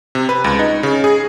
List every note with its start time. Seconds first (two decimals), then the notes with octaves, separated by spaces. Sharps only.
0.15 C3
0.29 B4
0.44 C#2
0.59 D#4
0.83 C#3
1.04 G#4